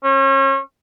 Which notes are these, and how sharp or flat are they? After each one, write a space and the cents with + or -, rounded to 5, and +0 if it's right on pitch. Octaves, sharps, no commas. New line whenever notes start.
C#4 -35